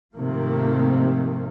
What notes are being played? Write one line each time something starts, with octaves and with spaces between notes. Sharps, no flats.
G#2 C3 D#3 F3 A3 A#3